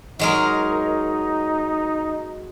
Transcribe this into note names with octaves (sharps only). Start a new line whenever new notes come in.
F#3 G#3 D#4 A#4